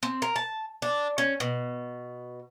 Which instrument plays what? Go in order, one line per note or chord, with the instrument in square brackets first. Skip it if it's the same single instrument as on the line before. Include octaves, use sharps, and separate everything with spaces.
[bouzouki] C4
A#4
A5
D4
C#4
B2